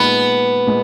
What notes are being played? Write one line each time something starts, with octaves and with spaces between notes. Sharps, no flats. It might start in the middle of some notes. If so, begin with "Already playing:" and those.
Already playing: A#2 G#3 B3 D#4 G#4
A#2 G#3